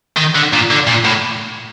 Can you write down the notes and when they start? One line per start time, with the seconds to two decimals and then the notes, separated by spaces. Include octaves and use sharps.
0.17 D#3
0.35 D3
0.53 A#2
0.71 D3
0.87 A#2
1.05 A2